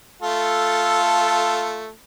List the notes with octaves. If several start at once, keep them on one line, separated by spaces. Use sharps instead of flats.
A3 F4 A4